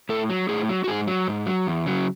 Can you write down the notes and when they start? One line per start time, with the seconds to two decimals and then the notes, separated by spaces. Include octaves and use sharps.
0.09 A2 A4
0.30 F#3
0.49 A2 G#4
0.69 F#3
0.84 F#4
0.88 G#2 G#4
1.07 F#3
1.28 G#2
1.47 F#3
1.67 E2
1.86 C#3 F#3